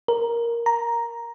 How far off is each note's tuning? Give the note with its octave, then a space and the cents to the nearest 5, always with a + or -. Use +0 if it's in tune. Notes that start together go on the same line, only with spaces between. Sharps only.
A#4 +5
A#5 +5